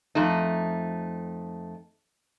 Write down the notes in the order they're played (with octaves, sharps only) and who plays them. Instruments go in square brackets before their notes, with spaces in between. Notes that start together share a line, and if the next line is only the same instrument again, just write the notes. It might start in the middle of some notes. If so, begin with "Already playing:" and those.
[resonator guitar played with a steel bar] F2 A3 D#4